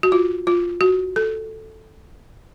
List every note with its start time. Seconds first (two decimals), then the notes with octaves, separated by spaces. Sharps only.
0.03 F#4
0.12 F4
0.47 F4
0.81 F#4
1.16 A4